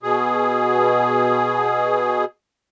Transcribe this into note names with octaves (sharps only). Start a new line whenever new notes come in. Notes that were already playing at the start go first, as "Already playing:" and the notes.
B2 G#4